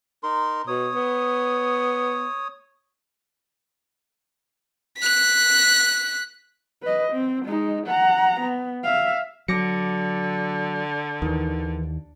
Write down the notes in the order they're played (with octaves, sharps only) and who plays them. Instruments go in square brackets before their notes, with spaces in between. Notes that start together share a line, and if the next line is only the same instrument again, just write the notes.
[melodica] D#4 A#4 C6
[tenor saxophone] B2 [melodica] C#5 D#6
[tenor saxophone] B3
[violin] F#6 B6
[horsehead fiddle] B4 D#5
C4
G#3 D#4
F#5 A#5
B3
E5 F5
[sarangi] D3 [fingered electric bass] F#3 [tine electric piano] D6 A#6 C#7
[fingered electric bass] D#2 [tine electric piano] D#3 E3